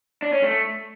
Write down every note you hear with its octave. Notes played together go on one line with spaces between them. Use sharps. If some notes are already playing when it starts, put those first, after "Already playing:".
D4
C#4
A3